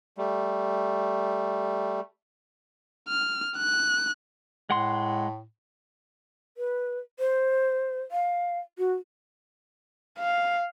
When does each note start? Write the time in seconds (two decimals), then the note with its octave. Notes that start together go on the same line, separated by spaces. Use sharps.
0.18 G3 A3
3.09 F6
3.57 F#6
4.69 A2 G#3 F#5 C6
6.57 B4
7.19 C5
8.11 F5
8.78 F#4
10.18 F5